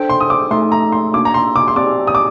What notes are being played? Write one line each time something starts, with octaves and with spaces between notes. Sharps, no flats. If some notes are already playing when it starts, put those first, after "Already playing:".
Already playing: D4 A4 C5 G5
C6
D#6
D6
A3 D#4 A4 C6
A#5
C6
A#3 D4 F#4 D6
A#5
C6
D6
C6
C4 G4 D5 A5 D6
D#6
D6